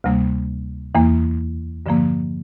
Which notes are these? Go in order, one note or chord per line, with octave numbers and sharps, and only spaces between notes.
D2 C3 G3 A#3
E2 E3 A#3
G2 D3 F3 A#3